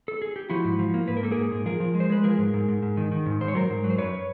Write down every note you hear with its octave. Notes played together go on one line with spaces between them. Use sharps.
A4
G#4
G4
F3 E4 F#4
G#2
F3
A#3
G#2 B4
A#4
A#3 A4
G#4 A#4
G#2
G#2
F3 G#4 A#4
F3
G#3
C5
G#3 B4
F3 G#4 A#4
G#2
G#2
G#2
G#2
D#3
D#3
G#2
G#2 C5
C#5
F#3 A#4 C5
G#2
F#3
C5
F#2 B4 C#5